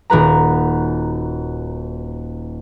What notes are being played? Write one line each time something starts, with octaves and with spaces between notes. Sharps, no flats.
D#1 F#4 B4 A#5